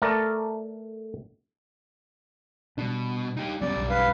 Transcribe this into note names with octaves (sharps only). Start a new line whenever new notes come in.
A3 A4 A#4 D5
B2 G3 D4
D#4 G4
F#2 F#3 G3 B3 C#4 D5
B1
B4 F5